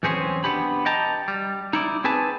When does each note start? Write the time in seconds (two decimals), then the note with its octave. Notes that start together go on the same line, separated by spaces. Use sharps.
0.03 B1 E2 C4 C#4 G#4 C5
0.44 B3 D4 G4 B5
0.86 D#5 G5 A5 A#5
1.28 G3
1.73 D#4 E4 D5
2.04 C4 G#4 B4 G#5 A5